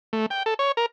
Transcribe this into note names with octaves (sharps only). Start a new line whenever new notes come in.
A3
G5
A4
C#5
A#4